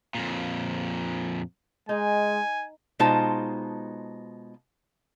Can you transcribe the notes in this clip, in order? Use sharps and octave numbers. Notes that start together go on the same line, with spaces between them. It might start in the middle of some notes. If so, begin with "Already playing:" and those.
F2 A#2
G#3 D#4 G#5
B2 G#3 D#4 F4 C5 A5